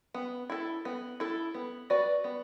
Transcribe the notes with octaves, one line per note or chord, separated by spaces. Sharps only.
B3
E4 A4
B3
E4 A4
B3
F#4 B4 D5
B3